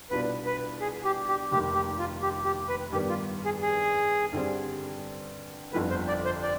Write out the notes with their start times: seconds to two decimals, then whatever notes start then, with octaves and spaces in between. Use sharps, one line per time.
0.10 C2 B2 B3 D4 F4 B4
0.46 B4
0.81 G#4
1.05 G4
1.28 G4
1.51 F1 D#2 D#3 G4
1.74 G4
1.98 F4
2.22 G4
2.45 G4
2.68 B4
2.92 G2 D#3 G3 B3 G4
3.09 F4
3.45 G#4
3.62 G#4
4.32 G2 D3 G3 C4
5.72 G1 F2 D3 F3 B3 B4
5.90 C5
6.08 D5
6.25 C5
6.43 D5